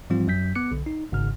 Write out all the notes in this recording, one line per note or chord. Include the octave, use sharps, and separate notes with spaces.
G#2 E3 F3 G3 C4 F4
F#2 F#3 G6 B6
B3 D6 F#6 C#7
B1 D3
D#4
G#1 G#2 C#3 F6